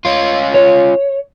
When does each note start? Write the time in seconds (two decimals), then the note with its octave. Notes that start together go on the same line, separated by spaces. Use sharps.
0.05 C#4 F4
0.54 C#5